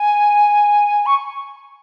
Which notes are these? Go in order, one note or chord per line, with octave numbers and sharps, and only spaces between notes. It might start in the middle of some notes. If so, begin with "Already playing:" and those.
Already playing: G#5
C#6